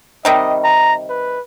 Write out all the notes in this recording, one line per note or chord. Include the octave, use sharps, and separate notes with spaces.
C3 D#3 G3 D#5
A#5
B4